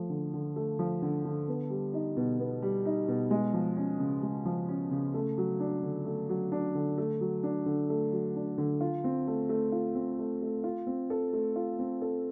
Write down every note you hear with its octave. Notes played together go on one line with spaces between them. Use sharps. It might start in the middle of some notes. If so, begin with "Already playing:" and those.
Already playing: F3 A3
D3
D3
A3
F3
D3
D3
B3
G3
D#4
B2
B3
G3
D#4
B2
G#3
F3
C#4
C#3
G#3
F3
C#4
C#3
A3
F#3
D4
D3
A3
F#3
D4
D3
A3
F#3
D4
D3
A3
F#3
D4
D3
F4
C4
A3
A3
F4
C4
A3
A3
F4
C4
A4
A3
F4
C4
A4